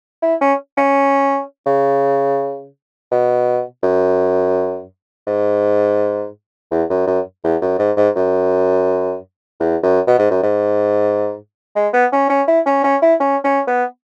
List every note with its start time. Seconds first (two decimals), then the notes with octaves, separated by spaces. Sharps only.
0.22 E4
0.41 C#4
0.77 C#4
1.66 C#3
3.12 B2
3.83 F#2
5.27 G#2
6.71 E2
6.90 F#2
7.07 F#2
7.44 E2
7.62 F#2
7.79 G#2
7.97 G#2
8.16 F#2
9.60 E2
9.83 F#2
10.07 B2
10.19 G#2
10.31 F#2
10.43 G#2
11.76 G#3
11.93 B3
12.12 C#4
12.30 C#4
12.48 E4
12.66 C#4
12.84 C#4
13.02 E4
13.20 C#4
13.44 C#4
13.67 B3